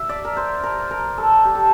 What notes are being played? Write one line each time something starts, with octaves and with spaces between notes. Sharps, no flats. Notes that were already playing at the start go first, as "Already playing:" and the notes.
Already playing: E5
D5
A#4
C5
A#4
A#4
A4
G4
A4